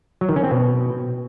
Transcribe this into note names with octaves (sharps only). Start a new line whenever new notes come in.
F#3
D#3
C#4
C4
B2